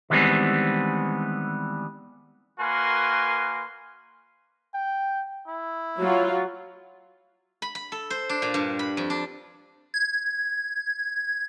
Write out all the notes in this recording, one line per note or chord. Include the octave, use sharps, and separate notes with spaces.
D#3 E3 G3 G#3 B3 C4
A#3 F#4 A#4 B4 G#5 C6
G5
E4
F#3 F4
B5
B5
A4
C5
D4
A#2
G2
B5
F2
D4
G#6